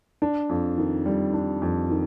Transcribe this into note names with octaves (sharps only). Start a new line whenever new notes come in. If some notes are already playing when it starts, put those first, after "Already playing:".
D4
F2
D#3
G3
D4
F2
D#3